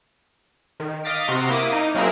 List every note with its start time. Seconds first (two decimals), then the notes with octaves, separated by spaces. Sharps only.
0.80 D#3
1.04 D#5 F5 D6 A6 B6 D7
1.28 C3 F#4 A#5 C6
1.49 A#3 E4 D6 D#6
1.72 D#4
1.95 F#3 A#3 C4 E4 G#4 A#4